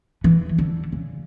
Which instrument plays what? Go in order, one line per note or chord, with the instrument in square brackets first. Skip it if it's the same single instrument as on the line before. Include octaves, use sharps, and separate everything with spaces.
[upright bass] E3
D3
C#3